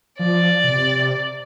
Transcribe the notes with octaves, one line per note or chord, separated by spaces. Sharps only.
F3 D5
C3